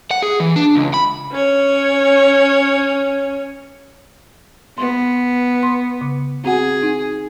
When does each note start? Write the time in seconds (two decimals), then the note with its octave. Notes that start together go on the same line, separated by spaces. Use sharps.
0.11 F#5
0.22 G#4
0.40 E3
0.56 D4
0.75 C#2
0.94 B5
1.31 C#4 C#5
4.78 B3 C6
5.63 C6
6.01 C#3
6.45 C4 F#4 G#4 F#5
6.83 D#4